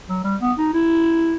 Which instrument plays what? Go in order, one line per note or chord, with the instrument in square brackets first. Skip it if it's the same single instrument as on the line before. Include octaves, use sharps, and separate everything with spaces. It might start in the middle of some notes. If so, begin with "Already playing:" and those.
[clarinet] F#3
G3
B3
D#4
E4